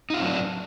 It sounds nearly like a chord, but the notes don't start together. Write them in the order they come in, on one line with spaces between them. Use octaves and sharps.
D#4 F4 C4 F#3 D4